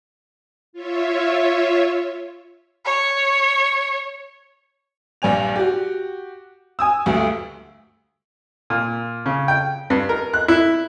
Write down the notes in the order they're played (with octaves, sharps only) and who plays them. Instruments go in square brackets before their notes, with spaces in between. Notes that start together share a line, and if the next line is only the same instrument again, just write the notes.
[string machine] F4 C#5 E5
[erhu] C#5
[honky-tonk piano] A#1 G2 D5 G#5 F7
F#4 G4
G#5 D#6 E6
D2 G2 A3
[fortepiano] A#2
C#3
G5
G2
A#4
F#6
E4